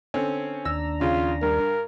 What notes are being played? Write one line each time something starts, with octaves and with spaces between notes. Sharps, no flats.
D3 C4 C#4
D#2 D4 A#5 E6
C#3 F4
G2 A#4